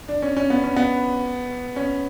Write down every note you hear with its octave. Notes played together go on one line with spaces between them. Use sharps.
D4
C#4
C#4
B3
C#4
B3
C#4